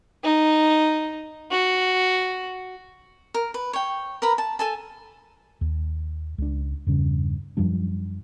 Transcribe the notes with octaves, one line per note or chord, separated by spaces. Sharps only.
D#4
F#4
A#4
B4
C#5 G5
A#4 B4 A#5 B5
A5
A4 G#5 A5
D#2
C#2 D4
E2 G2 C#3
F#2 F3 G3 D4